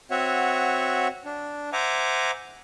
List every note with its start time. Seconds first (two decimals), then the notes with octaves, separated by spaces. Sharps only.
0.11 C4 F#4 C#5 E5 F#5
1.25 D4
1.73 C5 E5 F#5 G#5 A#5 D6